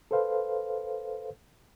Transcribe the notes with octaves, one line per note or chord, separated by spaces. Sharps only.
A4 B4 C5 F5